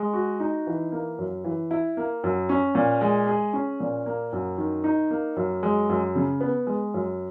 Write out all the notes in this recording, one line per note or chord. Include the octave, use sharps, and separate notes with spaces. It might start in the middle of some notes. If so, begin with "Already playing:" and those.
Already playing: G#3
F#4
D#4
E3
A#3
F#2
E3
E4
A#3
F#2
C#4
A#2
G#3
G#4
C#4
A#2
A#3
F#2
D#3
D#4
A#3
F#2
G#3
F#2
C#3
B3
G#3
F#2